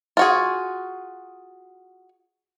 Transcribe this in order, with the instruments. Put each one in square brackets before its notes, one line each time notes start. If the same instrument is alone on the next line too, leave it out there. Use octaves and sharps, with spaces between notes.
[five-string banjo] F4 F#4 G#4